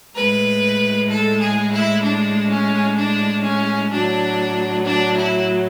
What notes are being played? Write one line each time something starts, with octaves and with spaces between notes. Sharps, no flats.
A2 G#3 B4
A4
G#4
E4
D4
C#4
D4
C#4
A2 F#3 D4
D4
E4